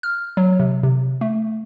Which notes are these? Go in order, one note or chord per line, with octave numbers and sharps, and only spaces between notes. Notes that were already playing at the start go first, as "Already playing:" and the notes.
F6
F#3
C3
C3
A3